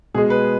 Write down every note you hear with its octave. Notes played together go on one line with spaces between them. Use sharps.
B2 G#3 G#4
B4